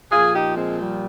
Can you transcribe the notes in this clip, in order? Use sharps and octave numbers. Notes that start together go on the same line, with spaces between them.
A#2 F3 F4 G#4
D#4 G4
G#3 C4
G3